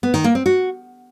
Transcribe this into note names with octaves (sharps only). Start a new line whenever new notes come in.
B3
D#3
A#3
C4
F#4